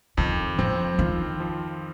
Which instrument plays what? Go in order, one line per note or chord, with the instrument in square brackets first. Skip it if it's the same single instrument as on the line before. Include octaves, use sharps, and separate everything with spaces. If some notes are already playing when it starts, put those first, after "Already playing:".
[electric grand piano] F2 [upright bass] D#3
[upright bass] F3 [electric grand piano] C4
[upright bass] D#3 [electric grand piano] F4
[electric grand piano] F3